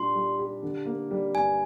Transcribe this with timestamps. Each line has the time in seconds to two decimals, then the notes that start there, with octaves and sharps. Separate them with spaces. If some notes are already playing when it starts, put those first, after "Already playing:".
Already playing: A#2 G3 D4 G4 C6
0.15 G3
0.39 G4
0.62 D3
0.86 A#3
1.11 G3
1.35 G2 G#5